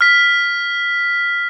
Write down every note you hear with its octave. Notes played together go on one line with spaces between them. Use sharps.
F6 B6